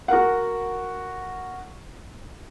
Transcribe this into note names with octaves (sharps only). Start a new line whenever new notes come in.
F#4 A#4 F#5